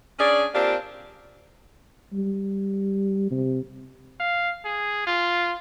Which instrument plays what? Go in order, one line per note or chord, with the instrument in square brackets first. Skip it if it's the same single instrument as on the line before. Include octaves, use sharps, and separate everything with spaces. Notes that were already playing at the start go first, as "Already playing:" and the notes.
[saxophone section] C#4 D4 G#4 D5
A#3 C4 D4 F4 G4
[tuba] G3
C3
[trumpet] F5
G#4
F4